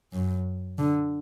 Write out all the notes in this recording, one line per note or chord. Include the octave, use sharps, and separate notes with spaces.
F#2
D3